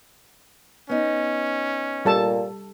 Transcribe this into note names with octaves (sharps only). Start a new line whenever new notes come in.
B3 C#4 D#4
A#2 G3 A4 A5